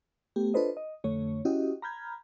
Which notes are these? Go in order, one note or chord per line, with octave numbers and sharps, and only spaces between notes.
A3 B3 G4
D4 F4 A4 B4 C5 D#5
D#5
F2 D3 A3 C#5
C#4 E4 F#4 G4 D#5
A#5 B5 F6 G6 G#6